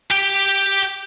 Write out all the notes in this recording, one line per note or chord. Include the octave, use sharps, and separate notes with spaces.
G4 G5